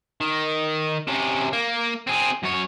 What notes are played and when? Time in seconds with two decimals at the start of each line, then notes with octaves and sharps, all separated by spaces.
0.21 D#3
1.08 C3 C#4
1.53 A#3
2.07 C4 G#4
2.43 F#2 C#5